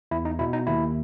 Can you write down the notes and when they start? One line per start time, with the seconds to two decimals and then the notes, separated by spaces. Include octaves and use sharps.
0.11 E2 E4
0.25 D#4
0.39 B2 E4
0.53 D#4
0.67 D#2 E4